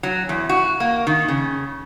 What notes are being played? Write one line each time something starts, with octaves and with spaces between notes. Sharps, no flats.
F#3
E2
F#4
A#3
D#3
C#3